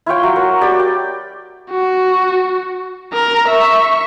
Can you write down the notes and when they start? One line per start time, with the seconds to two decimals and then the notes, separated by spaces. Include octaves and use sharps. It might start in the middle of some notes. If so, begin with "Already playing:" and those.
0.06 E4 F4 C#5 G5
0.23 F#3
0.36 F#4 A#4
0.61 G4 D5 B5
0.80 G5
1.70 F#4
3.13 A#4 A#5
3.48 E5 C#6